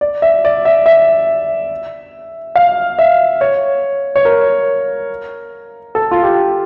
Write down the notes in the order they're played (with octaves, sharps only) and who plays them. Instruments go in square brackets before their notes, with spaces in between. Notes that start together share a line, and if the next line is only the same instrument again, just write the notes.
[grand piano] D5
E5
D5
E5
E5
F5
E5
C#5
C#5
A#4
A4
F4
G4